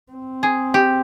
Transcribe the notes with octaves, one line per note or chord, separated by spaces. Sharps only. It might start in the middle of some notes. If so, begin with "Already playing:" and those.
C4
G#4
G4